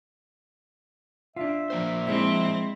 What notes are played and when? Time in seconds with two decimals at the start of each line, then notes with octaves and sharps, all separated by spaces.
1.36 D4 F4 E5
1.70 F3 A#3 C5
2.07 G#3 C4 E4